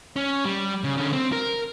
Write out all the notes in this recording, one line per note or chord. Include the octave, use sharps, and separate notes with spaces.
C#4
G3
C#3
D3 C#4
C4
A#4